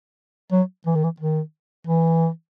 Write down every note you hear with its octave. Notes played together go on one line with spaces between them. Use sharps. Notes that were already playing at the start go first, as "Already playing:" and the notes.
F#3
E3
D#3
E3
D#3
E3